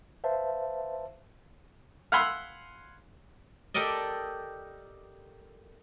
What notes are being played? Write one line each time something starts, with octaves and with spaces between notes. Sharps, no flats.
B4 C5 E5 F5 A5
F5 F#5 G#5 B5 C6 E6
G4 A4 A#4 D5 D#5